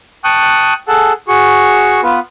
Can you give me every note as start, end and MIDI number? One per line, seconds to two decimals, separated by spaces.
0.24 0.74 79
0.24 0.74 81
0.24 0.74 85
0.24 0.74 87
0.24 0.74 90
0.88 1.13 68
0.88 1.13 69
0.88 1.13 78
0.88 1.13 81
1.28 2.01 66
1.28 2.01 68
1.28 2.01 85
2.03 2.20 59
2.03 2.20 65
2.03 2.20 71